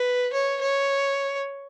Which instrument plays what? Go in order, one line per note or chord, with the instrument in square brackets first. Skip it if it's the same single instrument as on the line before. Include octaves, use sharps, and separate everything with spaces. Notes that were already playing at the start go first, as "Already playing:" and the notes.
Already playing: [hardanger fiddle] B4
C#5
C#5